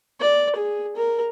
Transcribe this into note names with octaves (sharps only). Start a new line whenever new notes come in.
D5
G#4
A#4